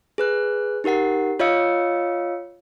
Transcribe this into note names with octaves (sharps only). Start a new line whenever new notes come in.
G#4 B4 F#6
D#4 G4 A#4 F#5 C7
F4 C#5 D#5 F5 E6 C#7